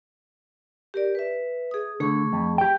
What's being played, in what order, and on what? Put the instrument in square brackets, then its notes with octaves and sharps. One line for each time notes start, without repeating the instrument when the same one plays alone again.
[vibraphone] G4 A#4 D5
B4 E5
G#4 D#6
[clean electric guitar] D3 [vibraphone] A3 G#4 C#6
[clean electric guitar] F2
G4 G5